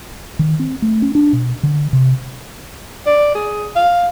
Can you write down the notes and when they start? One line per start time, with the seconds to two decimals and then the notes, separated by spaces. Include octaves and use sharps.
0.39 D#3
0.59 C4
0.82 A3
1.02 C#4
1.15 D4
1.33 B2
1.63 D3
1.93 C3
3.06 D5
3.35 G#4
3.75 F5